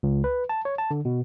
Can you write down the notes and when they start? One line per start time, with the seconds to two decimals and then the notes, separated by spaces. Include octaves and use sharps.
0.03 C#2
0.24 B4
0.49 A5
0.65 C#5
0.78 A5
0.91 D3
1.05 B2